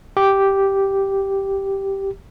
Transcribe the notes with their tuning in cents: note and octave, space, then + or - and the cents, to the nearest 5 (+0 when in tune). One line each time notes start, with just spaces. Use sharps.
G4 -5